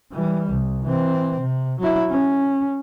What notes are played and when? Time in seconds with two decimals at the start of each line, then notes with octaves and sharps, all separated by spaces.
0.12 E3 G3
0.50 C2
0.84 E3 C4
1.40 C3
1.80 F#3 E4
2.10 C#4